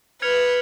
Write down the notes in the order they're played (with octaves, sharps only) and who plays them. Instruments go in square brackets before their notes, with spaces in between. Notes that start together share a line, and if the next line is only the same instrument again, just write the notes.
[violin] B4 [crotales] F6 G#6 C#7 F7